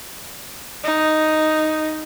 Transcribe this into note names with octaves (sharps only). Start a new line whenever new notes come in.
D#4